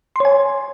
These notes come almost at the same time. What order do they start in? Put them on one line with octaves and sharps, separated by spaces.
C6 C#5 G#5